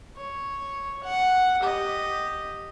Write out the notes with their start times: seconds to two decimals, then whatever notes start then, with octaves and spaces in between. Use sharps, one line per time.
0.16 C#5
1.04 F#5
1.60 G4 D#5